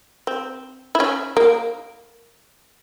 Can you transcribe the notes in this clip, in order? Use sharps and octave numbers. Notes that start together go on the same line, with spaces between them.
C4
E4
C#4
A#3